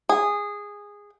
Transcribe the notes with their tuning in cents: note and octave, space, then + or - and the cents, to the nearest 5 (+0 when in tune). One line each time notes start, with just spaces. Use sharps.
G#4 -15